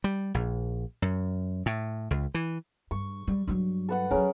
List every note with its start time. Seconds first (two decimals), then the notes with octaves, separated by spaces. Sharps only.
0.04 G3
0.34 A#1
1.02 F#2
1.66 A2
2.11 C#2
2.34 E3
2.91 G2 C#6
3.27 G3
3.48 G2 F#3
3.89 A4 B4 F#5
4.11 F3 F#3 C#4 G#4 A#4